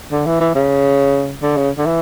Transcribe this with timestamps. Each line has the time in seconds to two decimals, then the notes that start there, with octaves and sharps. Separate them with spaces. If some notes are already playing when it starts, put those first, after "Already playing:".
0.11 D3
0.26 E3
0.40 E3
0.55 C#3
1.42 D3
1.56 C#3
1.77 D3
1.86 E3